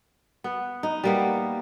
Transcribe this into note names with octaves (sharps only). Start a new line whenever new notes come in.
B3
D#4
G3 A#3 B3